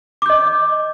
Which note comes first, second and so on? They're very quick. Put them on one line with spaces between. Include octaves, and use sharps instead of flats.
D6 G6 D#5